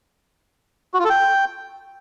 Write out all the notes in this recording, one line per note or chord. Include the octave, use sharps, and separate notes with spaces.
F#4
F4
A4
G5